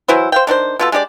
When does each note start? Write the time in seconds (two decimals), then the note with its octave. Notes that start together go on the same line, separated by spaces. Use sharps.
0.08 E3 F#3 E4 C5
0.32 C5 F5 G5
0.47 D#3 D4 F#4 C5
0.79 B2 F4 A4
0.92 G#3 D4 G4 D5